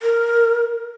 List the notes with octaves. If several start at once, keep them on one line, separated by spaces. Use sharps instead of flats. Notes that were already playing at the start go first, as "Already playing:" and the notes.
A#4